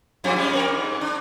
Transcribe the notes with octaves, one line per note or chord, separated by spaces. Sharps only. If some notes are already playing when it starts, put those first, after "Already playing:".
F#2 F3 C4
G3 G#3 C#4
C4 A#4
G#2
D4